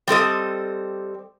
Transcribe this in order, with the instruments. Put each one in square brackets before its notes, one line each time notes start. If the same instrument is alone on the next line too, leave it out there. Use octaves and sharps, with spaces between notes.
[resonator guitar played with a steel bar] G3 C4 A4 D#5